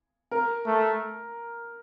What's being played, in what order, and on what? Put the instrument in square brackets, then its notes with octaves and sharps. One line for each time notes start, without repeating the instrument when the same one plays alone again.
[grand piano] A#4
[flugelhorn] A3